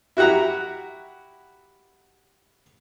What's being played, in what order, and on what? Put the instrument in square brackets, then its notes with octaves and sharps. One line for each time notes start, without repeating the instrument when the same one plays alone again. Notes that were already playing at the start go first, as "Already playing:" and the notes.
[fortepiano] E4 F#4 G4 F#5 A#5